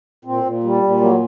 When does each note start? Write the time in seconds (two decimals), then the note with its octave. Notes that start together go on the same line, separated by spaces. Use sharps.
0.25 A#2 C4
0.43 A#2
0.64 G3
0.82 A#2
1.00 F#3 A#3